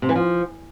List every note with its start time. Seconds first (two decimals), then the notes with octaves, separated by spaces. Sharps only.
0.02 C3
0.09 E3
0.16 F3